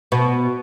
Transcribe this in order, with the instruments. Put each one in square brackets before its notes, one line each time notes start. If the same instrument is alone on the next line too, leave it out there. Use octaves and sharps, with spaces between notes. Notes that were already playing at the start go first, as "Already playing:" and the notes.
[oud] B2